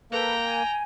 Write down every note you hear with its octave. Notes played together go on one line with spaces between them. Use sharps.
A#3 A4 B4 G5 A#5
G#5